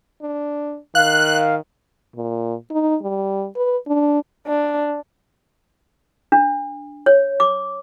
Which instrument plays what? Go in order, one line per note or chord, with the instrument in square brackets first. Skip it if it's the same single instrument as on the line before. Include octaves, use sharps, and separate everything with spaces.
[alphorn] D4
[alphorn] D#3 [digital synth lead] F5 [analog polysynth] F#6
[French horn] A#2
D#4
G3
B4
D4
[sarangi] D4
[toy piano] D4
C#5
D6